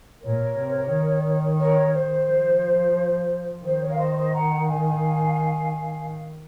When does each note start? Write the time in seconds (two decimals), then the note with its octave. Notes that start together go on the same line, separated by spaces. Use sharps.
0.23 A#2 A#4 C#5
0.57 C3
0.91 D#3
1.59 A#4 C#5
1.93 C5
2.27 F3
3.64 D#3 C5
3.80 A#4 C#5
3.92 F5
3.98 C5 D#5
4.15 C5 D#5
4.32 F#5 A#5
4.66 F5 G#5